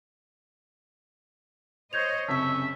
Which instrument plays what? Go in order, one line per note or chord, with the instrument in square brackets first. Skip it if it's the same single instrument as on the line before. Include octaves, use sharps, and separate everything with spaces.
[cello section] C5 C#5 D#5 [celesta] G6 G#6 F7
[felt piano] F#1 C3 C#6 [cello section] C#4 [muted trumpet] E5 [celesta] A5